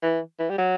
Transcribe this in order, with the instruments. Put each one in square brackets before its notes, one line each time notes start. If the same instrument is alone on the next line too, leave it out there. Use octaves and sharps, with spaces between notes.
[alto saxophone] E3
E3
G3
F#3